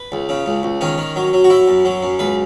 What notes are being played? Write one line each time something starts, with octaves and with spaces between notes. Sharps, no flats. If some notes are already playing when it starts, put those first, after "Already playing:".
Already playing: B4
C#2
C#3
C#2
C#2
D#3 C#4
D#3
F#3
F#3
F#4
F#3 E4
F#2
F#3
F#2
C#2 B4